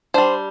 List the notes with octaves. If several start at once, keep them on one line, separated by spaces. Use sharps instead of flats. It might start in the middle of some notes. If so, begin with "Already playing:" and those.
G3 D4 C5